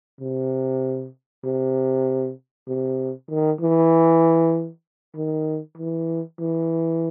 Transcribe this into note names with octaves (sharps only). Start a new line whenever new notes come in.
C3
C3
C3
D#3
E3
D#3
E3
E3